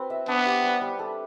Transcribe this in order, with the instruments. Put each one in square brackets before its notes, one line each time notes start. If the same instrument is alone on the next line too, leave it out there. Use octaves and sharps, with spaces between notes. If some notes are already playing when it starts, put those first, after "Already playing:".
Already playing: [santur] C4 F#4 B4
E5
[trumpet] B3 [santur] D4
[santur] G4
G3
G3
A4